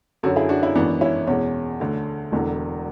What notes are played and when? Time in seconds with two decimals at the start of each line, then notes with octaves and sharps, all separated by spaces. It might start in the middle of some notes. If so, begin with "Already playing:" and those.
0.23 F#2 D3 F#3 F#4 A4
0.36 E4 G#4
0.49 D4 F#4
0.62 C#4 E4
0.75 G#1 F#2 E3 B3 D4
1.01 C#4 E4
1.27 E2 B2 G#3 C#4
1.80 D2 D3 A3
2.32 E1 E2 D3